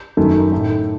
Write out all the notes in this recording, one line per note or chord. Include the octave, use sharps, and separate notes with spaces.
F#2 D#3 A3
A2 A3 D#4